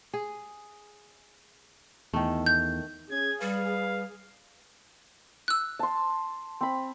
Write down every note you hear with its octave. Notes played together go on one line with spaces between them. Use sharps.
G#4
E2 D#3 A3
G6
C#4 G#4 G#6
G3 B4 F5
E6 F#6
A5 C6
C4 B5